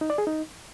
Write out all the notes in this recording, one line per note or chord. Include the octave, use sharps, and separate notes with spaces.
D#4
D5
G#4
D#4